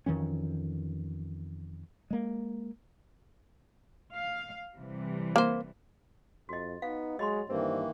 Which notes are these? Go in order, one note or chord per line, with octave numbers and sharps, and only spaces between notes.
F2 D#3 E3 C#4
G#3 A#3
F5
C3 E3 G3
A#3 C5
F2 F#4 D#5
B3 D#4 F5
F#3 G#3 D#5 B5 C6
G2 D#3 E3 A#3 C4